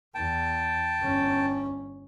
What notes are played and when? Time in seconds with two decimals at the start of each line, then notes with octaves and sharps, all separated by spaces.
0.15 E2 G5 A5
1.01 G1 C#4